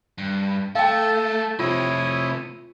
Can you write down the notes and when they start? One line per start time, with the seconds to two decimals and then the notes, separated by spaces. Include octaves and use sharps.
0.18 G2
0.75 A3 A4 F5 G5 A5
1.59 C3 F3 E4 F4 C#5 D#6